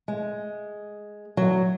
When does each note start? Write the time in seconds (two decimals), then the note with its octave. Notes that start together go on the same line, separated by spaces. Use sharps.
0.08 G#3
1.37 F#3